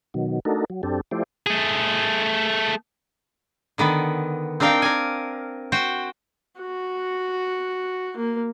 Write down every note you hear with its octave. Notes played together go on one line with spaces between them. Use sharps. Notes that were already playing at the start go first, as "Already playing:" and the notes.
B2 D#3 F#3
A3 D4 D#4 F#4 A4 A#4
F#3
F#2 C4 D4 G4 A4
F3 A3 E4 G4 C5 D5
A3 G#4
D3 D#3 B3 B4
C4 D4 D#4 A#4 F5 G5
A#4 D5 G#5
F#4 C5 F#5 G5
F#4
A#3